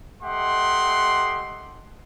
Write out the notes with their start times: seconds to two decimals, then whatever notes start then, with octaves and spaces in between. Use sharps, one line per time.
0.23 A3 G4 D#5 F#5 C6